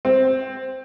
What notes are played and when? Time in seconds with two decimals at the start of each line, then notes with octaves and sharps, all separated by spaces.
0.05 C4